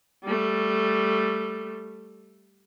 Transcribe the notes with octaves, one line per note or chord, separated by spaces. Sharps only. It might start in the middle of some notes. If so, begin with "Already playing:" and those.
G3 A3